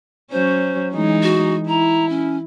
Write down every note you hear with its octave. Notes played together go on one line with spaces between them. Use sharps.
F#3 C#4 C5
E3 G#3 D#4
F#4
E4 A#5
C#4